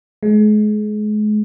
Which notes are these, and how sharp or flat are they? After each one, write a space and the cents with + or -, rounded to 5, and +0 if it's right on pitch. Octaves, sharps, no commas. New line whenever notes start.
G#3 +35